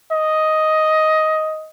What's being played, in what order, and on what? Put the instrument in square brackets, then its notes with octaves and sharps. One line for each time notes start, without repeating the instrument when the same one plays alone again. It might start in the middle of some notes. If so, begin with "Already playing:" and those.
[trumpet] D#5